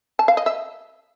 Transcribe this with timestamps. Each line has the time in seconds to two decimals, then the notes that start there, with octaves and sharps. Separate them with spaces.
0.19 A5
0.28 F5
0.37 D#5
0.46 E5